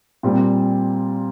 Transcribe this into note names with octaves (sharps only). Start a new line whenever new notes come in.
A#2 G3 C4